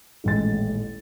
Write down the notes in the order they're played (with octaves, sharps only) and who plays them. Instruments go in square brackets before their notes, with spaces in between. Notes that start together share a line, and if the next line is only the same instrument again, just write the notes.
[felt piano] D#1 A1 G#3 A6